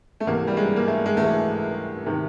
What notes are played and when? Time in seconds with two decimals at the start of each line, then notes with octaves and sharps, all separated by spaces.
0.20 A3
0.27 C2 C3 E3 A#3
0.47 G3
0.57 G#3
0.76 A#3
0.87 A3
1.06 G#3
1.17 C2 C3 E3 A3
2.06 C3 D#3